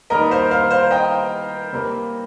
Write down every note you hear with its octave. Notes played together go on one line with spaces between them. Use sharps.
D#3 G3 A#3 A#4 D#5
C5 F5
C5 F5
C5 F5
D#5 G5
C3 G3 A#3